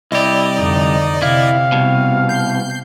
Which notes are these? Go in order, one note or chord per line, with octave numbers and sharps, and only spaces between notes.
C2 E4 G4 D5 D#5
F2 D3 D#4
C3 E4 F5
C2 B2
G6 C7